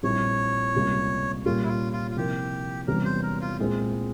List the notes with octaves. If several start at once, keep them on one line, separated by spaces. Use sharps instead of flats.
A#1 A#2 G3 C4 E4 C#5
C#2 C3 G3 A#3
A#2 G3 A#3 C#4 F4 G4
E4
F4
F4
F4
C3 F3 A#3 E4 G4 A#4
E1 E2 C3 G3 C#4 A#4
C5
A#4
F4
C2 A#2 G#3 C4